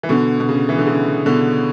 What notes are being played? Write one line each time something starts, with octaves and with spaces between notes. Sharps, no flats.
E3
B2 D3
B2
C#3
E3
D3
C#3
B2 D3